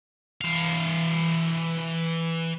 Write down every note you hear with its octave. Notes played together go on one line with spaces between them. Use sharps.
E3 F5